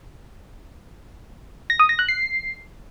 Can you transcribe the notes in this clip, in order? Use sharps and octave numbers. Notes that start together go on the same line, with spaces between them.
A#6
D#6
A#6
F#6
C7